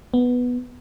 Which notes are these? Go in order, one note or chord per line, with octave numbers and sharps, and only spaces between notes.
B3